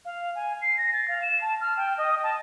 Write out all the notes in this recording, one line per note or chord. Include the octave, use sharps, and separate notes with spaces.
F5
G#5
C7
A#6
A6
F5
E7
A5
F6
G5
D#5
A5